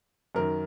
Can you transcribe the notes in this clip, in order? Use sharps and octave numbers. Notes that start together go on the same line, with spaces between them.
F#2 D#3 A#4